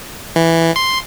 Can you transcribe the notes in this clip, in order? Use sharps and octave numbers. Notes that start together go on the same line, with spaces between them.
E3
C6